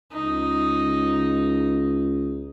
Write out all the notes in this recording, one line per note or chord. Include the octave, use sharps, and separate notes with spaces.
C#2 D#4